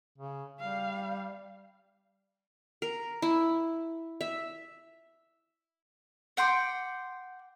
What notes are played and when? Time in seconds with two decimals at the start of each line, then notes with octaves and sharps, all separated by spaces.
0.18 C#3
0.60 G3 F5
2.82 A#4
3.22 E4
4.21 E5
6.37 F#5 G5 C6 D6